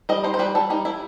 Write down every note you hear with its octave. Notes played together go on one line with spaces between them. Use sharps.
G3 D#5
D#4 C5
C5
G3 B4
G3 A4
G3 D#4
G3 E4